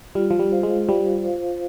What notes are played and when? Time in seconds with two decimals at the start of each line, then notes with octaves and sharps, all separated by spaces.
0.15 G3 F4
0.30 F3
0.39 G3
0.51 C5 F5
0.63 G#3
0.88 G3 F4
1.24 C5 F5